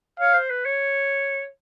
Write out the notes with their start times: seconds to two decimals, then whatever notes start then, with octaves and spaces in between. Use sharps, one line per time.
0.19 C#5 F5
0.34 C5
0.50 B4
0.65 C#5